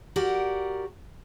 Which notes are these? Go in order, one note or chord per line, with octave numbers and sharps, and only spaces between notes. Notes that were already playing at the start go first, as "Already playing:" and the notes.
F#4 G4 A#4 D5 F#5